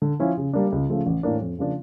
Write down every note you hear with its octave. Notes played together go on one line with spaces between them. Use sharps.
D3
F3 C#4 E4
C#3
G3 A#3 D4
C#2
C#3 F3 A3
A1
A2 E3 A#3 D4
F2
C#3 F3 A#3 D4